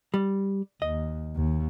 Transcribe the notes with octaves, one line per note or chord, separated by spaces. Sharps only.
G3
D#2 D#5
D#2